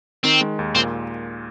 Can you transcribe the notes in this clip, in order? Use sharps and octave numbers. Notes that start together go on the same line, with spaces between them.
D#3 C4
G#3
D#2
A#2 C4